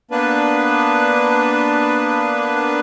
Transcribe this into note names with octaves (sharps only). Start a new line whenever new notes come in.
A#3 B3 D4 B4